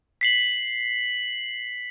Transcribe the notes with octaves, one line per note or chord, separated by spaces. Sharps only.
B6 C7 F#7